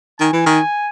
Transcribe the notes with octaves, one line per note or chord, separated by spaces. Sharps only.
D#3 G#5
E3
D#3